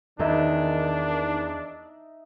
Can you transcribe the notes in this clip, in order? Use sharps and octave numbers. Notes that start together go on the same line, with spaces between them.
E2 D#3 D4 D#4 D#5 E5